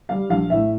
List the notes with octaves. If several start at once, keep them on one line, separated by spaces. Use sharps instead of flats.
G3 F5
A#1 F5
A2 E5